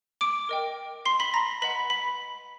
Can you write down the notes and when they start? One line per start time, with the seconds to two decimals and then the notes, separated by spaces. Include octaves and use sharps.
0.21 D6 D7
0.49 A#4 D#5 G5
1.05 C6 C7
1.20 B5 B6
1.34 A#5 A#6
1.62 B4 D#5 F#5 B5 B6
1.90 B5 B6